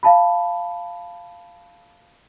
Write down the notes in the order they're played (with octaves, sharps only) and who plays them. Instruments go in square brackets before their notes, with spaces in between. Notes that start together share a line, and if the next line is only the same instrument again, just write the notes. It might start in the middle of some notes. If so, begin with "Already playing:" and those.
[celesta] F5 A5 B5